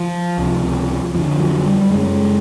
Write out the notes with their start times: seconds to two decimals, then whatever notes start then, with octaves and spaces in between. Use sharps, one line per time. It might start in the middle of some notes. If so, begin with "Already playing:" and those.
Already playing: F3
0.38 C#2 C3
1.15 F2 D3 F3
1.40 F#3
1.66 G3
1.90 F#2 C#3 G#3